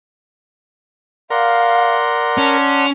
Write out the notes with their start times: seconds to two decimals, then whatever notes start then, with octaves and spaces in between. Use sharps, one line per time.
1.30 A#4 D5 F5 F#5 C6
2.38 C#4 A5